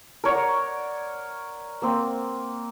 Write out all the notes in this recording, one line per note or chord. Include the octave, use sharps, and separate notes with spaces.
A#4 C#5 D5 F#5
A#3 C4